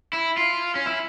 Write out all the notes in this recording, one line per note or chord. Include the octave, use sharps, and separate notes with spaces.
E4
F4
C#4
E4